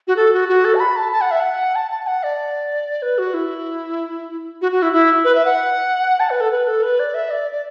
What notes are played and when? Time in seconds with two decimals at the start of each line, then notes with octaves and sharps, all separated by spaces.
0.08 F#4
0.17 A4
0.33 F#4
0.49 F#4
0.65 A4
0.75 A5
0.80 B5
0.96 A5
1.13 A5
1.21 F#5
1.31 E5
1.40 F#5
1.75 A5
1.91 A5
2.07 F#5
2.23 D5
3.02 B4
3.18 F#4
3.34 E4
4.62 F#4
4.72 F#4
4.82 E4
4.93 E4
5.24 B4
5.35 E5
5.45 F#5
6.20 A5
6.30 B4
6.41 A4
6.51 B4
6.68 A4
6.83 B4
7.00 D5
7.14 E5
7.31 D5
7.53 D5